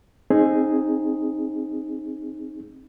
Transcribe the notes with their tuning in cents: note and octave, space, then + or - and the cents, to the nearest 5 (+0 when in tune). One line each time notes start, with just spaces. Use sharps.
C4 +25 D#4 +0 G#4 +0